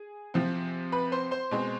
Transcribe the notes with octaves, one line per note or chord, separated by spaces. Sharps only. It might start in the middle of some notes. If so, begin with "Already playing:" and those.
Already playing: G#4
C3 F3 C4
B4 B5
C5 C6
C5 C6
B2 G#3 C4